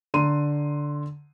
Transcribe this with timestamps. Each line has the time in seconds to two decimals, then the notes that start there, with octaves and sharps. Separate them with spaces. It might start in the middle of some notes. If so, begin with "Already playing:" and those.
0.14 D3 A#5 C6 D#7